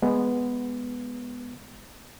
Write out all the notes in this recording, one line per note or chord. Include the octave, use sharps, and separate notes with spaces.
G#3 B3